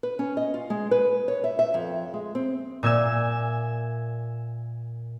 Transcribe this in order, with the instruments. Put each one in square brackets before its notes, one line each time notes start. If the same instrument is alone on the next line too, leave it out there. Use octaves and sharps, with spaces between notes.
[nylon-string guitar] B4
C#4
D#5
F4
G#3
B4
C#5
E5
E5
F2
G#3
C4
[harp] A#2 E5 G#5 E6